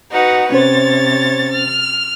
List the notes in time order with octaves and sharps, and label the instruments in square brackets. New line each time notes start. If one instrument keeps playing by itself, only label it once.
[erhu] D#4 [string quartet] F#4 B4 F#5
[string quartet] C3 A6 [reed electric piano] C#4 C5 [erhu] C#5
[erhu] F6